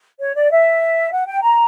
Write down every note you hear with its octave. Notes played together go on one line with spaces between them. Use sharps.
C#5
D5
E5
F#5
G5
A#5